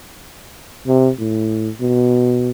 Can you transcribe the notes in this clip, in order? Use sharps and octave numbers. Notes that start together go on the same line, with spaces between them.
C3
A2
B2